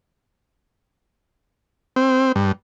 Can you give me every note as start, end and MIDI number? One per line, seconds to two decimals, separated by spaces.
1.96 2.32 60
2.36 2.52 43